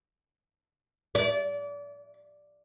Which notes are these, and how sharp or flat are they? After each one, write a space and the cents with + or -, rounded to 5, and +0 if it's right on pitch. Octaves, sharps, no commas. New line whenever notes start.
D5 -30